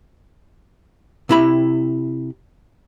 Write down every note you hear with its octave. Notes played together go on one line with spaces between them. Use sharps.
C3 E4 B5